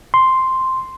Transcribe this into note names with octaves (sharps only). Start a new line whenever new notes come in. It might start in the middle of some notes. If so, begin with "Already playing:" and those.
C6